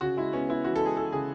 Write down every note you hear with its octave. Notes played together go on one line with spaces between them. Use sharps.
C#3 F#4
G#3 E4
B3 C#4
B3 E4
E3 F#4
A4
G#3 G#4
E3 A4
C#3 G#4